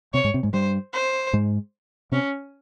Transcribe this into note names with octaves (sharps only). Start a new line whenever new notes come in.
C3 C4 C#5
G#2 G#3
C3 C4
G#2 G#3
G2 G3 C5
C5
G#2 G#3
C3 C4 C#4